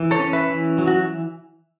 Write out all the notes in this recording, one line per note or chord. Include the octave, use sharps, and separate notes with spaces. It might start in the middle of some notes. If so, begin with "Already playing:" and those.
Already playing: E3
A4 C#5
C#4
B4 E5
E3
F#3
F#4